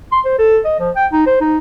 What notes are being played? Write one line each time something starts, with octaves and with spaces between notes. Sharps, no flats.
C6
C5
A4
D#5
F3
G5
D#4
C5
D#4